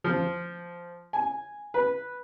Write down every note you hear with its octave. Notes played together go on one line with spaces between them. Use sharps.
F3
G#5
B4